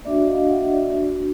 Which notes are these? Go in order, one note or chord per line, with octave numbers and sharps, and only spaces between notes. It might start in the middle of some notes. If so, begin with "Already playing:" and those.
A#3 D4 F#4 D5 E5
D#5 F5
E5 F#5
D#5
D5 E5